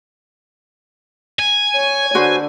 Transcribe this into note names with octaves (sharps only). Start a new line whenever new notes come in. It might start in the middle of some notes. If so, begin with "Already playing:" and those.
G#5
C#5
D3 F#4 B4 C5